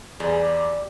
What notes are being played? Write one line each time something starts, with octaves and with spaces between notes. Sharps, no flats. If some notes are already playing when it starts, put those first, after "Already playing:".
E2 G3 G#4
D6